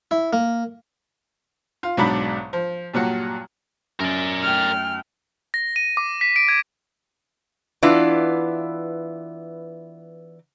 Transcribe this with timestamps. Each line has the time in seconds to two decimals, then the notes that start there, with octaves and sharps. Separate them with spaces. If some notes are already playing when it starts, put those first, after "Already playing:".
0.11 E4
0.33 A#3
1.83 F4
1.97 B1 G#2 F#3 D4 D5 B5
2.53 F3
2.94 G2 A#2 F#3 F#4
4.00 F#2 A#4 D5
4.43 A3 G5 F6
5.54 A#6
5.76 D#7
5.97 D6
6.21 B6
6.36 D7
6.48 G#6
7.83 E3 B3 D4 E4 F4